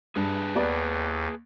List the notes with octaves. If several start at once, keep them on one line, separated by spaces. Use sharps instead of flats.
G2 G#4 B4 A5
D#2 B3 D5